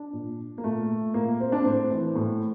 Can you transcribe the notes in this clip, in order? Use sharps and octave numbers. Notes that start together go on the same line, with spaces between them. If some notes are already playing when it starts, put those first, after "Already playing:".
Already playing: D4
A#2
A#3
A#2 A3
A#2 A#3
C4
D4
A2 C4
E3
A2